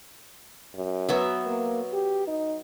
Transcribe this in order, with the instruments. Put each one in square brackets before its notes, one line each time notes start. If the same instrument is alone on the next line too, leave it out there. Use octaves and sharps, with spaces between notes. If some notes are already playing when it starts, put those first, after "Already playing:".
[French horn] F#2
[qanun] F#3 B3 E5
[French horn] A#3
G4
D#4